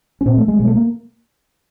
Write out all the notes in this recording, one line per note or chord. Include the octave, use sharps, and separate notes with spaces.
C#4
A#2 C4
A3
G#3
B2 G#3
A3
A#3